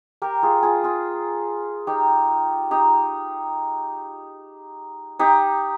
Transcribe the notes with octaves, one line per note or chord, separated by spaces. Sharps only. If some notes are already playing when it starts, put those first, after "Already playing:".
G4 A#4
F4 G#4
F4 G#4
F4 G#4
D#4 G4
D#4 G4
D#4 G4